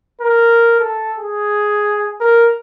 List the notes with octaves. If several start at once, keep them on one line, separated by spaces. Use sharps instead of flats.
A#4
A4
G#4
A#4